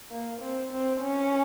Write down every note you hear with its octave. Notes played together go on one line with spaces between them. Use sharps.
A#3
C4
C4
C#4